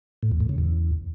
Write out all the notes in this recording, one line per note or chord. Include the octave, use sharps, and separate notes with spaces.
A2
E2
A2
C#3
E2